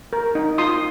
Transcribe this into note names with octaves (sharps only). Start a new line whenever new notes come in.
A#4
D#4
F4 C6 D#6